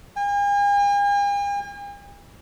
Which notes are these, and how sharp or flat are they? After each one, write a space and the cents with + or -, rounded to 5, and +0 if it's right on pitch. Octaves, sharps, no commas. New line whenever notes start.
G#5 -45